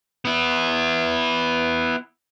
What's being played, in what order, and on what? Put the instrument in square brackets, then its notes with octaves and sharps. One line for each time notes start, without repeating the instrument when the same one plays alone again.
[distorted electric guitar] B3 E4